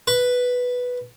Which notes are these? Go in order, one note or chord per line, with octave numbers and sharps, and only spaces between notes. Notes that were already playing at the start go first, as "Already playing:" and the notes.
B4